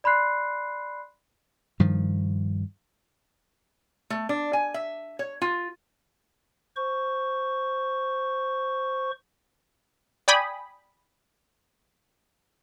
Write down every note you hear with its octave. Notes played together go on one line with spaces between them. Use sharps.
D5 B5 C6 F#6 C7
G2 D#3 F3
A3
D4
G#5
E5
C#5
F4
C5 C#6
D5 G5 G#5 B5 D#6